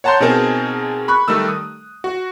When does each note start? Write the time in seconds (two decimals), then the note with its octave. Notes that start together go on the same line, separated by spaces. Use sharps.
0.04 C#5 F#5 A5 A#5 C6 G6
0.20 B2 C4 D#4 G#4 A#4 A5
1.08 B5 C#6 F#6
1.28 D#3 G3 A3 E6
1.48 D#6
2.04 F#4